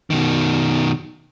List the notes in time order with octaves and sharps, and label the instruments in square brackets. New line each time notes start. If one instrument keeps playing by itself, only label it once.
[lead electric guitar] B2 D#3